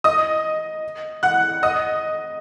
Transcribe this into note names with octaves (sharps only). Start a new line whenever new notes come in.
D#5 D#6
F#5 F#6
D#5 D#6